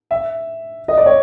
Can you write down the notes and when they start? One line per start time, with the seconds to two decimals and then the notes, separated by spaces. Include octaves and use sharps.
0.11 E5
0.88 D#5
0.97 D5
1.06 C#5